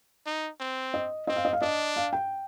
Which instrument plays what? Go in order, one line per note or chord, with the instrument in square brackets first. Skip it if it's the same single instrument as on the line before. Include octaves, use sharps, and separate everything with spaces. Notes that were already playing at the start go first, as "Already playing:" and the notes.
[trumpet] D#4
C4
[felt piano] D#5
[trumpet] C4 [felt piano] D#5
[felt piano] F5
D#5
F5
[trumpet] D4 [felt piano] D#5
[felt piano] F5
G5